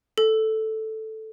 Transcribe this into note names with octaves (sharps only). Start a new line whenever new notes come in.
A4